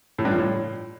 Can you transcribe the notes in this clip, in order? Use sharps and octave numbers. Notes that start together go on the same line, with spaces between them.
A2
G2
F3
A2